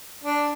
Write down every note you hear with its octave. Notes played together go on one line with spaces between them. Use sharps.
D4